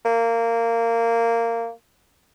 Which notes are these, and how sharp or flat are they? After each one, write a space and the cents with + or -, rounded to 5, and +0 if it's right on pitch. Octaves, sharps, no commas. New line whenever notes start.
A#3 -15